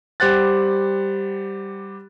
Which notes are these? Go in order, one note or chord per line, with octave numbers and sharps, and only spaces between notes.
G3 G4 C5 F#5 F#6 A6